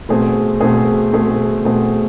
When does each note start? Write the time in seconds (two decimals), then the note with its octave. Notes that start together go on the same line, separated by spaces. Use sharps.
0.09 B2 A3 C4 G#4
0.61 B2 A3 C4 G#4
1.13 B2 A3 C4 G#4
1.65 B2 A3 C4 G#4